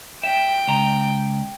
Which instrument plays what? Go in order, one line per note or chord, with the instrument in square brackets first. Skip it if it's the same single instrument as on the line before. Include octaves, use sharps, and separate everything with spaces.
[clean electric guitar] E5 [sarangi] G5
[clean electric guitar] C#2 D#5 A#5